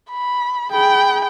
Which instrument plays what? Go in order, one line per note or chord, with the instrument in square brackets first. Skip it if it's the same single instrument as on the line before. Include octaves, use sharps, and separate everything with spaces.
[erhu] B5
[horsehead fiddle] G#4 B5 [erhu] G5